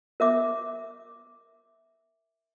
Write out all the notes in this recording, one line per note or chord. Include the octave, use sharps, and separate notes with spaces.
A#4 E5 D6